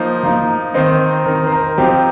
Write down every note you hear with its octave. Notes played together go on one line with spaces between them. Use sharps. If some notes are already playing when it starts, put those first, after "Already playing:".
Already playing: F3 A#3 D#4 C5
F3 A#3 D#4
D#3 C4 D#4 C5
D#3 C4 D#4 A#4
C5
A#4
F3 C4 D#4 G4